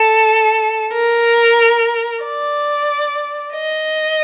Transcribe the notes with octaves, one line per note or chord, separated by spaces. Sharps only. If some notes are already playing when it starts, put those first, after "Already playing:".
Already playing: A4
A#4
D5
D#5